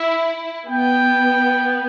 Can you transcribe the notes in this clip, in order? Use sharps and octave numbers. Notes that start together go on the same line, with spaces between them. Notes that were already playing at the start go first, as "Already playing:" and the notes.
Already playing: E4 E5
B3 G5